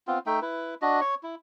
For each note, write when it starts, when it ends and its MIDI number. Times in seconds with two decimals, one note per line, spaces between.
0.07 0.19 59
0.07 0.19 60
0.07 0.19 65
0.26 0.40 57
0.26 0.40 63
0.26 0.40 76
0.26 0.40 79
0.42 0.75 64
0.42 0.75 71
0.82 1.00 62
0.82 1.00 66
0.82 1.00 75
1.01 1.15 73
1.01 1.15 85
1.23 1.35 64